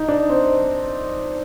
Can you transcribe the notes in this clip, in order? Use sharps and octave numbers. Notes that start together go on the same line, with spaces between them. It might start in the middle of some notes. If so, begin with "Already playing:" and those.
Already playing: D#4
D4
C4